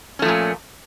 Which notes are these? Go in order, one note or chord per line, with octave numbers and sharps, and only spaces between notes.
A#2 F3 A3 C#4